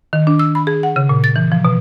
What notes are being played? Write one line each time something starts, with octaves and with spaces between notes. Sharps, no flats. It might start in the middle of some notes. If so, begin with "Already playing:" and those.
D#3
D4
E6
B5
G#4
F#5
C#3
A#2
A6
E3
F3
B2